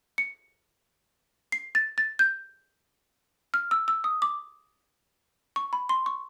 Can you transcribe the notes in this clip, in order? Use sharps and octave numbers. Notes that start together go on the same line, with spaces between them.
C#7
C7
A6
A6
G6
F6
E6
E6
D#6
D6
C#6
B5
C6
C#6